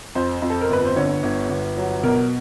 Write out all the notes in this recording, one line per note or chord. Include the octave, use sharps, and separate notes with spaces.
F2 C5
F2
A4
A#4
G1 B4
C5
D3 C#5
G1
G1
F#3
B2 A#4